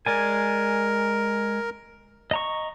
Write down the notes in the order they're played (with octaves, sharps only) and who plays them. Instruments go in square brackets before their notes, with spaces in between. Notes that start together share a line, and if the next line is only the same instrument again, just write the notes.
[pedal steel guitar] G#3 D5 G#5 [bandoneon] A#4
[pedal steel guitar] D#5 A#5 C#6